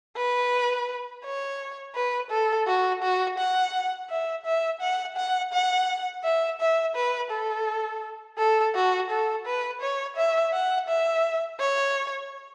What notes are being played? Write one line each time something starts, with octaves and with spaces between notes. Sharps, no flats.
B4
C#5
B4
A4
F#4
F#4
F#5
E5
E5
F#5
F#5
F#5
E5
E5
B4
A4
A4
F#4
A4
B4
C#5
E5
F#5
E5
C#5